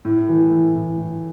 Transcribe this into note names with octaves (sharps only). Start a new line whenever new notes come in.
A2
E3
A2
A2
A2